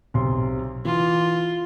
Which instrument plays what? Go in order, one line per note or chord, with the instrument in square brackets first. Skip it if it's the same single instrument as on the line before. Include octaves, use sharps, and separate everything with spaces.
[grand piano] B1 C3 C6
[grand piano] E3 [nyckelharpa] F4